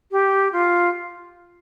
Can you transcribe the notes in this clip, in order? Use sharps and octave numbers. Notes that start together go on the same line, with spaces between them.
G4
F4